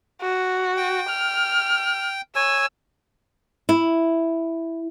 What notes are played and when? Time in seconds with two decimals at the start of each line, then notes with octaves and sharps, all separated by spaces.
0.21 F#4
0.77 G5
1.09 F6
2.36 C#5 G#5 E6
3.69 E4